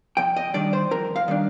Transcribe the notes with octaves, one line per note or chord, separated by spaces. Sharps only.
F2 G5
D#5
D#3 G3 D4 D5
C5
F2 A#4
F5
D#3 G3 D4